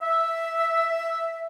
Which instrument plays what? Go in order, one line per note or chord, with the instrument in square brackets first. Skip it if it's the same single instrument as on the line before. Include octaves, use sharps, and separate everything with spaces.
[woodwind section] E5